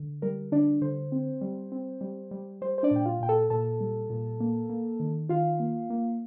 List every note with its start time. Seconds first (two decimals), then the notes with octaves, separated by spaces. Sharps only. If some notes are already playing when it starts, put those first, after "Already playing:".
Already playing: D3
0.22 G3 A#4
0.52 D3 D4 D5
0.81 D3 C5
1.12 C4
1.41 G3
1.72 C4
2.01 G3
2.31 G3
2.62 G3 C5
2.78 C5
2.83 D4 D5
2.91 A#2 G5
3.05 F4 F5
3.21 A#2 G5
3.29 A4 A5
3.50 A#2 A4 A5
3.81 G3
4.10 A#2
4.40 A#3
4.70 A#3
5.00 D#3
5.29 D#3 F4 F5
5.60 A#3
5.90 A#3